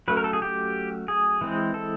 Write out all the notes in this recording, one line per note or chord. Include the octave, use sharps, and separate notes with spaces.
F#3 A3 C#4 B4
A#4
A4
G#4
G4
G#4
E3 G#3 C4
A4